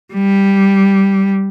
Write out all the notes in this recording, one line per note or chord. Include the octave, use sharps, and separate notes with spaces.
G3